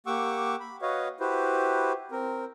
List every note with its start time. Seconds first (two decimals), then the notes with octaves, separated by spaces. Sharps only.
0.07 A#3 G4 F#5 C#6 D6 E6
0.60 B5
0.82 F#4 B4 C#5 D#5 F5
1.20 E4 F#4 G4 B4 C5
2.12 C4 A#4